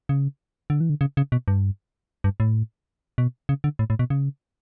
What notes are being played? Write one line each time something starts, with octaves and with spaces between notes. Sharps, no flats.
C#3
D3
E3
D3
C#3
C#3
B2
G2
G2
A2
B2
C#3
D3
A2
A2
B2
C#3